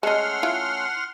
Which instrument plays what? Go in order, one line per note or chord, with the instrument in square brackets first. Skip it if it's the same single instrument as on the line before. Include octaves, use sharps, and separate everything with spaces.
[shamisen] G#3 D#5 [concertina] A3 C#4 E6 [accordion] F#5 C6 F6
[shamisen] E4 F4